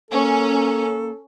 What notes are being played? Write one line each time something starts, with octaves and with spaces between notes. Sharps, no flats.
A#3 C#4 A4